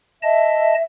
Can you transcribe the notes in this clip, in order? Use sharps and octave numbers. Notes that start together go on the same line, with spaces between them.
D#5 E5 A5